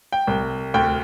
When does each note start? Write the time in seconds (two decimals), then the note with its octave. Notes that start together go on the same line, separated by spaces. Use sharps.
0.12 G5
0.27 C2
0.74 D2 G5